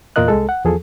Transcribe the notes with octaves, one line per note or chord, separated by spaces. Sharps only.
E2 A#2 F4 A#4 D#5 F#6
C2 G#3 A4
F#5
E2 F3 G#4 A4